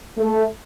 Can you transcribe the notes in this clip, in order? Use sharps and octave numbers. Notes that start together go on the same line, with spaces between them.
A3